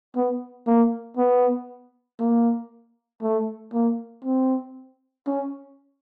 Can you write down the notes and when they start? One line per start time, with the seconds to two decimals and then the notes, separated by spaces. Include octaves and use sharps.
0.16 B3
0.67 A#3
1.17 B3
2.19 A#3
3.22 A3
3.73 A#3
4.24 C4
5.27 C#4